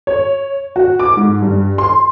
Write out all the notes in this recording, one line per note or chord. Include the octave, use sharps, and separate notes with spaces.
C#5
F#4
D6
G#2
G2
C6